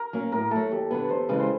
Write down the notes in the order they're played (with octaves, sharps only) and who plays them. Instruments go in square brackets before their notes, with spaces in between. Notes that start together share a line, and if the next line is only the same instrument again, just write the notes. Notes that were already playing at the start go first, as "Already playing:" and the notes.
Already playing: [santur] A#4
[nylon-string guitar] F#3 A#3 C#4
[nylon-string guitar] A2 [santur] A#4
[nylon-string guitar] F#3 A3 [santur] A4
[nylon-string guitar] D#2 [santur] G4
[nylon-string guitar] D3 F#3 B3 [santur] B4
[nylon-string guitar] E2 [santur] C5
[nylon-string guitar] C#3 E3 G#3 [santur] B4
[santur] C5